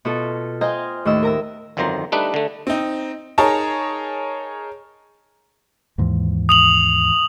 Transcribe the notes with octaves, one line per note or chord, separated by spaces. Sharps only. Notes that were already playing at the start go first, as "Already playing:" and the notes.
B2 F4 A4
C5 D#5 F5 G5 G#5 A#5
D#2 A2 D#5 E6
A#4 A#5 E6
G1 F2 D#3 F#3 C5 A#5
G3 A3 D4 D#4 B4
D3 A3
C4 D#4
D#4 G#4 A#4 C#5 A5 A#5
D#2 G#2 E3
D#6 F7 F#7